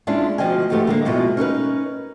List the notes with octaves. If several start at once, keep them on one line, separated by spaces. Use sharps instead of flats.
G#3 C#4 D4 E4 F4 G#4
D2 B2 F3 D#5 G5 G#5
E2 G#2 F3 A3 B3 G4
D3 G#3 A#3
F2 G#2 B2 G#3 E4 F4
C#4 D#4 A#4 B4